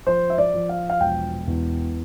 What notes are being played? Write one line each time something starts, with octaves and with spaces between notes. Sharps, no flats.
F3 C5
E5
D5
F3
F5
F5
E1 G5
E2